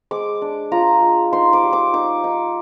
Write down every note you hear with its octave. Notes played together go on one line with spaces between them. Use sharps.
G#3 D6
D4
F4 A#5
G#3
D#4 C6
D6
G3
D6
D#4 D6
D#4